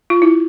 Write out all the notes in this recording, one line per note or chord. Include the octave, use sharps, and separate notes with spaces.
F4
E4